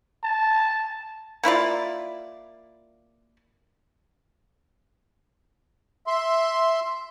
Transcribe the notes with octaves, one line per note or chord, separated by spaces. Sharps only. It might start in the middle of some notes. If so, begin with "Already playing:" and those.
A5
A#3 E4 F4 D5
E5 C6